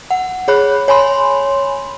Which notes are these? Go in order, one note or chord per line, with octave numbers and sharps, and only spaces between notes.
F#5
G#4 C#5 B5 F#6
C#5 G#5 B5 C6